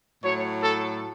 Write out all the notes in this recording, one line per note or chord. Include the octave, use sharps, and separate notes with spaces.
A2 F#3 C#5
A4